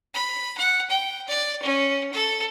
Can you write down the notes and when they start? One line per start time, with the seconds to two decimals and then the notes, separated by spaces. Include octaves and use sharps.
0.14 B5
0.58 F#5
0.90 G5
1.28 D5
1.63 C#4
2.13 A4